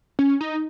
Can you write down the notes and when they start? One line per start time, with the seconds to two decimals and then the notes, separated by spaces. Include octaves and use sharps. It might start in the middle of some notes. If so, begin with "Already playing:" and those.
0.19 C#4
0.41 D#4